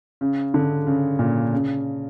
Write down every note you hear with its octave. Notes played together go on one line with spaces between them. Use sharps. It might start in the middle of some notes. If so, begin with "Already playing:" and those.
C#3
D3
C#3
A#2
C#3